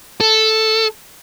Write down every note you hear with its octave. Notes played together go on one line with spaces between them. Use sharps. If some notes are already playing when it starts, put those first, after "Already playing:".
A4